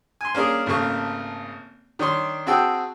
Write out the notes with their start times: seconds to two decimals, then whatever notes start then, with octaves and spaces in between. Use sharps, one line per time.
0.21 G#5 C6
0.34 A#3 C#4 D4 G#4 A#4
0.66 G#1 C#3 A3 A#3 C#6
1.99 D#3 D4 C#5 C6
2.46 C4 F#4 G#4 G5 A5 E6